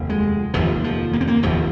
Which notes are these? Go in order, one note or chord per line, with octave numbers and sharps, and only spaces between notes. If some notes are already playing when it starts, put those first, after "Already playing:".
Already playing: F1 D#2
G#3
F1 D#2 F3
F3
A#3
C4
A#3
F1 D#2 F3